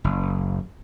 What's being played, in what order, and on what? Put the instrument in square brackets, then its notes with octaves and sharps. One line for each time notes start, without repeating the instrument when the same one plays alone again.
[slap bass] F#1